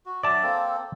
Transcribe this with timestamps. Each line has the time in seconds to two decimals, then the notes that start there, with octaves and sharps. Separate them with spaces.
0.06 F#4
0.23 F#3 D4 D5 E5 A5
0.43 A#3 C4 A4